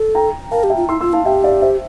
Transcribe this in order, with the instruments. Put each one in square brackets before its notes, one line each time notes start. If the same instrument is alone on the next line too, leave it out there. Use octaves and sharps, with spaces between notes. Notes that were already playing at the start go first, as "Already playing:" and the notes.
Already playing: [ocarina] A4
[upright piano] G5 A#5
[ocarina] A#4 [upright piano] F5 A5
[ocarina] G4
[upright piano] E5 G5
[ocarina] F4
[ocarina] E4 [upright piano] C6 E6
[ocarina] F4 [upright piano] C6 E6
[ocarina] E4 [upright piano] F5 A5
[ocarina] G4 [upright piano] E5 G5
[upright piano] D5 F5
C5 E5